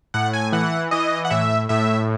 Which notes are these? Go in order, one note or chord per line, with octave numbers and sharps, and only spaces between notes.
A2 F#5
G#5
E3 F#5
E3 D#5
F#5
A2 E5
A2 E5